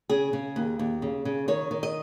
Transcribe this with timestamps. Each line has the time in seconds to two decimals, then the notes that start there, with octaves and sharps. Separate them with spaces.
0.09 C#3 G#4
0.33 C#3
0.56 D#2
0.79 D#2
1.02 C#3
1.25 C#3
1.48 D#3 C#5
1.71 D#3
1.83 D#5